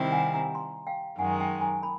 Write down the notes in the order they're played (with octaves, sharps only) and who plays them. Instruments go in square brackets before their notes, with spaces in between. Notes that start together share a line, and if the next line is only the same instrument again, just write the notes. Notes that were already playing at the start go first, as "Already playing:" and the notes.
Already playing: [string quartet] C3 D#3 G3 C4 E4
[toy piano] F#5 G#5
G#5 A#5
A#5 C6
F5 G5
[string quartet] F#2 D#3 G#3 [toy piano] F#5 G#5
[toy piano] G5 A5
G#5 A#5
A5 B5